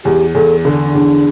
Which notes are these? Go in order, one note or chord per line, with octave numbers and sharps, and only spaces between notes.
E2 G4
E2 A4
D3 D4
E2 D4